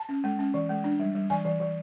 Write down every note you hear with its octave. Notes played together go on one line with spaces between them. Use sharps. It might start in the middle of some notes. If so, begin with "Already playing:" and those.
Already playing: A5
C#4
G#3
C#4
E3
G#3
D4
G3
G3
E3 G#5
E3
E3